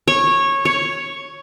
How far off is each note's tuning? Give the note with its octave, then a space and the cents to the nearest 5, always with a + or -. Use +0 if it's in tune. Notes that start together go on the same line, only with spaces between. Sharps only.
C#5 -15
C#5 +5